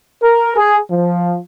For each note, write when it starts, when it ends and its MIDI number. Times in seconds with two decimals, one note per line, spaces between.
0.22 0.53 70
0.57 0.78 68
0.91 1.38 53